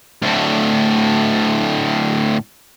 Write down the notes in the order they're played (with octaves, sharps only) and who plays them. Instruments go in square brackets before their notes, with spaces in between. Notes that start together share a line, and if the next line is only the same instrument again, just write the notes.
[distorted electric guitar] D2 A2